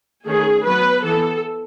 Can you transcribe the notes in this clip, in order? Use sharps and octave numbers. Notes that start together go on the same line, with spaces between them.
D#3 A3 C#4 G#4
F#3 B3 B4
E3 B3 A4